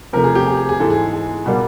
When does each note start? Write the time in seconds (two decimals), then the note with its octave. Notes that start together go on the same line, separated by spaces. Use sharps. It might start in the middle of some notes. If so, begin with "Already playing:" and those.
0.13 C3 F3 A3 A#4
0.24 G#4
0.35 G4
0.46 G#4
0.57 G#4
0.69 G#4
0.80 G#2 E3 G#3 A4
0.90 G#4
1.13 G#4
1.46 B2 G3 A#3